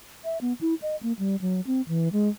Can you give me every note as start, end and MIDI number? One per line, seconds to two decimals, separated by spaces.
0.24 0.38 76
0.41 0.53 59
0.61 0.74 64
0.82 0.96 75
1.03 1.13 58
1.19 1.36 55
1.41 1.61 54
1.67 1.82 60
1.88 2.09 52
2.12 2.29 56